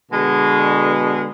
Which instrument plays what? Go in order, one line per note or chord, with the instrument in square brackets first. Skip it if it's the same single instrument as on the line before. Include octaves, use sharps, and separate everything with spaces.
[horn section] B2 D3 G#3